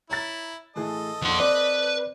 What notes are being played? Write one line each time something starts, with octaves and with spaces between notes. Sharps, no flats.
E4 C#5 A#5 A6
A2 E3 G#4 A4 D#5
A#1 F2 F#5 C6
C4 B4 D5